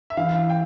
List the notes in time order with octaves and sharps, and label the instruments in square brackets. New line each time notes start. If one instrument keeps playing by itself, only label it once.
[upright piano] E5
[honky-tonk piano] E3 [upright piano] F5
[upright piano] G5